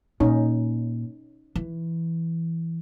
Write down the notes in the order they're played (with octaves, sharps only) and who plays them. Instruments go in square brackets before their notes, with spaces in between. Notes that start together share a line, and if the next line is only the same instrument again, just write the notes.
[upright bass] A#2 [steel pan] C#4 D#4
[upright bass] E3